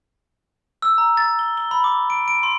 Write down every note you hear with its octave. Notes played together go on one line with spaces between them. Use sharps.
E6
A#5
A6
G7
G7
B5
D6
D7
D7
C6